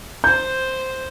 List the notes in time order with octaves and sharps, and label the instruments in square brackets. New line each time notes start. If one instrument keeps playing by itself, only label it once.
[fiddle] C5 [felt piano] G6